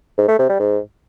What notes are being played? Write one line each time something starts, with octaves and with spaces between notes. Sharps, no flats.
G#2
A3
C3
G3
G#2